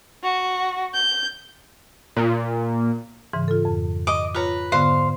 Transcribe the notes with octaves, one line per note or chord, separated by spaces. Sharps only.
F#4
G6
A#2
G#2 C#3 E3
F4 A4
F2
D#5 D6
F4 B4 C#5 A#5
G#2 D3 B3 C5 F5